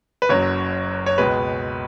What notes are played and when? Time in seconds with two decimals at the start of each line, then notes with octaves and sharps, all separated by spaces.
0.22 B4
0.29 F#1 F#2 F#3 C#5
1.06 C#5
1.18 C#2 B2 G#3 B4